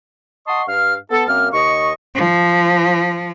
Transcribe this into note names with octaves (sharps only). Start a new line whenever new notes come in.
D#5 F#5 A5 C6 C#6 D#6
G2 F5 F6
B3 A4
F#2 A#3 C4 F6
D#2 D#5 C#6
F3